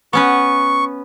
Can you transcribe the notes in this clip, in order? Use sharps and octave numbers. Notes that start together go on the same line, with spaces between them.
B3 C#4 B4 C#6